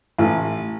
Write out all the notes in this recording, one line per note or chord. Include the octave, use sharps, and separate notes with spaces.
A1